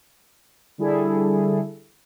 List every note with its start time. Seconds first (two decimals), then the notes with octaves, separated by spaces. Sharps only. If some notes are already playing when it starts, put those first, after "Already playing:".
0.78 D3 G3 E4 G#4 A4